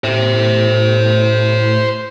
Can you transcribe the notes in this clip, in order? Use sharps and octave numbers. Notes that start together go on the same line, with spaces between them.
A2 C5 E5